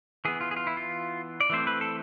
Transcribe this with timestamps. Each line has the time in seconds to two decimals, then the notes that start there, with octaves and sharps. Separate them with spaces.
0.25 E3 B3 G#4
0.41 F4
0.51 G#4
0.56 F4
0.67 E4
0.77 F4
1.41 D5
1.50 E3 A3 C4 C5
1.67 B4
1.81 A4